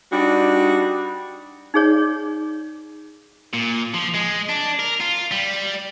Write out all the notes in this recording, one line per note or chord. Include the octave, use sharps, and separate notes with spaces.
G3 D4 D#4 F#4
D#4 G#4 C#5 D5
A#2
F3
G#3
D4
A#4
F4
G3